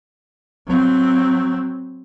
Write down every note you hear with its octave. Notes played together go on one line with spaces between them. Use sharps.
F#3 C4